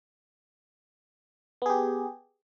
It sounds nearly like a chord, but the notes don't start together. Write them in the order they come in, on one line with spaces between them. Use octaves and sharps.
B3 G#4 G4